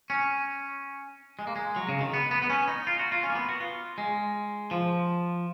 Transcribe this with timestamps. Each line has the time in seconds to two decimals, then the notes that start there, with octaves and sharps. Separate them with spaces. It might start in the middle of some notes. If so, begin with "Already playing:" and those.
0.10 C#4
1.39 G#3
1.47 A#3
1.56 G#3
1.76 F#3
1.89 C#3
2.01 D#3
2.14 B3
2.31 B3
2.42 B3
2.50 C#4
2.68 D#4
2.87 F4
2.99 F#4
3.12 F4
3.23 C#4
3.30 A#3
3.35 B3
3.49 F#4
3.60 F4
3.98 G#3
4.71 F3